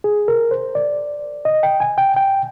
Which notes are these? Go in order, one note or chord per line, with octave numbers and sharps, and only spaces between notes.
G#4
A#4
C5
D5
D#5
G5
G#5
G5
G5